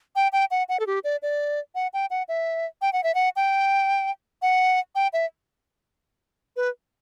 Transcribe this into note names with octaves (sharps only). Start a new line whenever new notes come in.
G5
G5
F#5
F#5
A4
G4
D5
D5
F#5
G5
F#5
E5
G5
F#5
E5
F#5
G5
F#5
G5
E5
B4